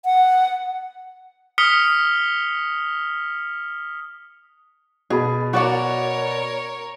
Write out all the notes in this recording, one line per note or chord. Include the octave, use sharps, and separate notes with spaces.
F#5
D#6 F6 B6 C#7 G7
B2 G#4 B5
F#4 A#4 C#5 D5 F#5